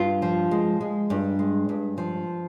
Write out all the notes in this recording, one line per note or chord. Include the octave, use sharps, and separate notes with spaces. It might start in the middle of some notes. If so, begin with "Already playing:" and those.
Already playing: G2 F4
F3
G#3
G#3
G2
G#3
G2
F3